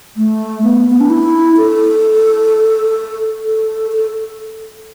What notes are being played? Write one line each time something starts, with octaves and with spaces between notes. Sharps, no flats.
A3
B3
B3
D4
E4
A4
A4
A4